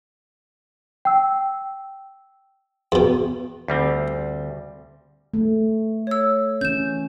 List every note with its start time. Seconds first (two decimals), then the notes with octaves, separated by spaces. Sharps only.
1.05 G5 E6
2.92 E2 B2
3.68 D2 G3 C4
5.34 A3
6.07 C#5 E6
6.61 E3 C#4 G6 E7